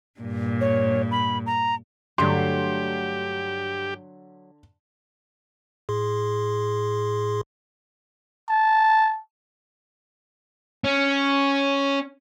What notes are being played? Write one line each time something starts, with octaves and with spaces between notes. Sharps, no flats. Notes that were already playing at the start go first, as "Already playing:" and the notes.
G2 A#2
C#5
B5
A#5
G2 D3 F#3 A3 G4 C6
A2 G#4 C6
A5
C#4